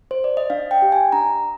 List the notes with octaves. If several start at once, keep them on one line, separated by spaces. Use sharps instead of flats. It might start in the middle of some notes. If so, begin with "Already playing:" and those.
C5
D5
D#5
D4 F5
G5
G4
G#5
D4 A#5